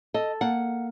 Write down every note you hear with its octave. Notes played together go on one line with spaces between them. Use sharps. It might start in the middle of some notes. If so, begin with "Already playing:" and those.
A4 D#5
A#3 F#5